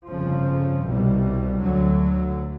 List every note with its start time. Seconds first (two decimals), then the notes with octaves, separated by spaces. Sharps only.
0.08 G1 F2 C#3 F3
0.84 C2 B2 G3
1.60 D2 D3 F#3